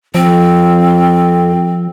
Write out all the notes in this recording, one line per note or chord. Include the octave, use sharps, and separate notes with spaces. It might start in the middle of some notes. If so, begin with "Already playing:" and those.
F2 F3 C4